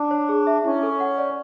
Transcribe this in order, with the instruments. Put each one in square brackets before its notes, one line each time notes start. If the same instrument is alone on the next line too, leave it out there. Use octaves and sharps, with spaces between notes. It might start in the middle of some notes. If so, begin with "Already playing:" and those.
Already playing: [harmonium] D4
[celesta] C#5
G#4
E5
[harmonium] C#4 [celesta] E4
[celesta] A4
F#5
D5